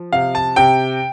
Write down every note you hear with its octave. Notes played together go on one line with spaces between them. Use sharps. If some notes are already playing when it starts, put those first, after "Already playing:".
Already playing: F3
C3 F5
A5
C3 G5